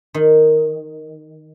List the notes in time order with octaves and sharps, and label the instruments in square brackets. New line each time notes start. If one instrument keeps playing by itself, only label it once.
[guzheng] D#3